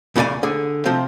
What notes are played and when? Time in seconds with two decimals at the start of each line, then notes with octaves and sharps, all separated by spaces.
0.16 E2 C#3 F4 G4 D5 G#5
0.43 D3 G#4
0.85 C3 F3 C4